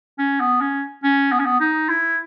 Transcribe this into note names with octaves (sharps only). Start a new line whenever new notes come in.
C#4
B3
C#4
C#4
B3
C#4
B3
D#4
E4